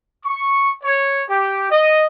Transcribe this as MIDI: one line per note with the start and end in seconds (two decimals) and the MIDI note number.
0.25 0.72 85
0.83 1.22 73
1.30 1.70 67
1.71 2.04 75